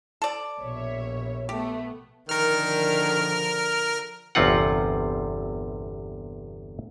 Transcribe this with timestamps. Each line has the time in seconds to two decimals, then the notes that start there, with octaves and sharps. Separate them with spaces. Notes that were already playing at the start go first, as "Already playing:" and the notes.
0.22 A4 D5
0.61 A#1 B2 C#5 E5
1.49 A3 B3 G4
2.29 D3 D#3 F3 A#4 F6
4.35 G1 E2 C3 C4 F4 F#5